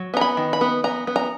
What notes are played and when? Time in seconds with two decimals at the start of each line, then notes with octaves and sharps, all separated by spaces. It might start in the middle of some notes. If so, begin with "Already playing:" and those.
Already playing: F#3
0.14 B3 A#5
0.21 B5
0.37 D#3
0.53 B5
0.61 B3
0.84 B3 A#5
1.07 B3
1.16 A#5